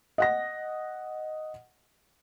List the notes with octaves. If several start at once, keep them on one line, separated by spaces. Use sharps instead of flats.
D#5 F#5 A#6